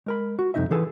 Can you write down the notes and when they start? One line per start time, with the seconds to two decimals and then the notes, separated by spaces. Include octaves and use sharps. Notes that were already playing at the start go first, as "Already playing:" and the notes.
0.06 G#3 A#4 B5
0.39 F#4
0.54 C2 F2 F3 D#4 D#5 E5
0.71 E3 G#4 A4 B4